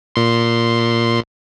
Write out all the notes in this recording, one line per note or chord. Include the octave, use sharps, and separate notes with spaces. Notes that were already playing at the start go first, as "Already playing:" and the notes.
A#2 C6